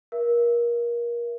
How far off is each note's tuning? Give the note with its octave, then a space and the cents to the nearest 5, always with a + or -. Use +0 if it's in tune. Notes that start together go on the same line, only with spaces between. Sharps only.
A#4 +25 E5 +25